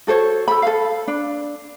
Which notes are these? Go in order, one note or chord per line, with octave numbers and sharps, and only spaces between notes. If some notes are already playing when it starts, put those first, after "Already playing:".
F#4 A4 C5 C#5
A4 B5
A4 F5
D4